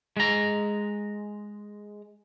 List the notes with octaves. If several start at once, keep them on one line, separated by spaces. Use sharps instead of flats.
G#3 A#5